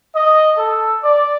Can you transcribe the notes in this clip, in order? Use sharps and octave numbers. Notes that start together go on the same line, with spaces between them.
D#5
A4
D5